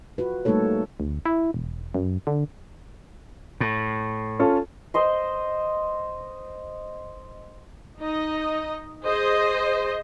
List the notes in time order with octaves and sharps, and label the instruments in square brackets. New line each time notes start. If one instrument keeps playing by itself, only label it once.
[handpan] F4 F#4 B4
G3 A3 A#3 D#4 A4 C#5
[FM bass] D2
E4
E1
F#2
D3
[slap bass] A2
[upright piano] C#4 F4 A4
[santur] C5 D#5 C6
[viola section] D#4 D#5
G#4 C5 D#5